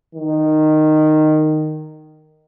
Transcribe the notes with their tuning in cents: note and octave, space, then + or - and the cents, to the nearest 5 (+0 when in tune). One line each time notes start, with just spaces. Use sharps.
D#3 -10